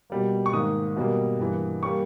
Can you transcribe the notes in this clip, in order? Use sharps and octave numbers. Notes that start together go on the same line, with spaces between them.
B2 G3 A#3
C#6
G#2 D#3 A#3 D#6
B2 G3 A#3
G2 E3 A#3
G3 A#3 C#6